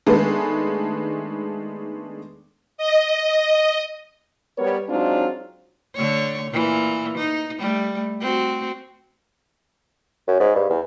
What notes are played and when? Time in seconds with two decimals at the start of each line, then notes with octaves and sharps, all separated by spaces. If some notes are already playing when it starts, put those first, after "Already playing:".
0.06 D#3 G#3 A3 B3 D4 B4
2.78 D#5
4.58 G3 B3 A#4 B4 C#5
4.89 F#3 G#3 C4 D4 D#4 F4
5.95 D3 A3 C#5
6.51 A#2 E3
7.18 D#4
7.59 G3 A3
8.21 C4 F#4
10.28 F#2
10.40 G#2
10.55 G2
10.70 E2